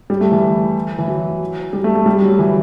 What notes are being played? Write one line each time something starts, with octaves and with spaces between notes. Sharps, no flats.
G3
A3
E3
E3
F#3
G3
A3
A3
G3
F#3
E3